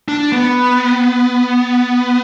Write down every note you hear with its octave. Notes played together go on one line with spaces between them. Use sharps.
D4
B3